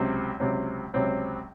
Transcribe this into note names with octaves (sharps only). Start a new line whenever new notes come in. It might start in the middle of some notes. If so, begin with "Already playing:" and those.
Already playing: C#2 C3 F#3 C4
C#2 C3 F#3 C4
C#2 C3 F#3 C4